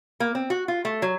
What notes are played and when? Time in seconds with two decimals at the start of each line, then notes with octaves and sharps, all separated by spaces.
0.20 A#3
0.35 C4
0.50 F#4
0.68 F4
0.85 A3
1.02 F#3